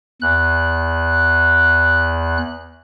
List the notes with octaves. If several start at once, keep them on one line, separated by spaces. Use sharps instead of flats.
E2 F#6